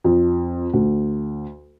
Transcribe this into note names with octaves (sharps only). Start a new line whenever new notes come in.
F2
D2